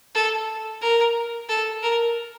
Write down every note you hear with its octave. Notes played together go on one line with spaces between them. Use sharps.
A4
A#4
A4
A#4